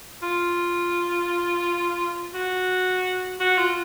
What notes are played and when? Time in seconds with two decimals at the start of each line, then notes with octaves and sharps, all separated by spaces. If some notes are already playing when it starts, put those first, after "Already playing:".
0.22 F4
2.34 F#4
3.40 F#4
3.58 F4